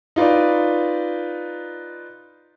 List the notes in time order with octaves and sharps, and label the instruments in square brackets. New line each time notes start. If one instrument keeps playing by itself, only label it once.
[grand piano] D#4 F4 B4 D5